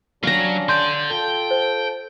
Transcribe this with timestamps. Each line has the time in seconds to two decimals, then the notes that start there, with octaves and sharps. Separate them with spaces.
0.23 F#3 G3 C#4 D4 F5 A#5
0.69 D3 D5 C6 G6
1.11 F4 A4 G5
1.51 C5